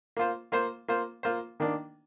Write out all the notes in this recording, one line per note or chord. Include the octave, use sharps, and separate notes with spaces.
A#3 F4 C5
A#3 F4 C5
A#3 F4 C5
A#3 F4 C5
D#3 A#3 D4